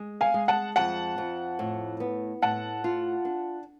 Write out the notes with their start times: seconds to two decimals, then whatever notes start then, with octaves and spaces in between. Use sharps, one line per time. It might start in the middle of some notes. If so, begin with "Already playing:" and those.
Already playing: G#3
0.21 F5 G#5
0.34 G#3
0.48 F#5 A5
0.76 F2 F#5 A5
1.18 F2
1.59 A2
2.00 B3
2.42 A2 F#5 A5
2.84 F4
3.25 D4